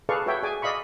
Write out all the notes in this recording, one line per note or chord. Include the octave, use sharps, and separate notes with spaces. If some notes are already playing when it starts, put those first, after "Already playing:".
G#4 A4 B4 D5 F5 C#6
F#4 B4 C#5 E5 G5
G#4 D5 G#5 D6
D5 D#5 F5 B5 C#6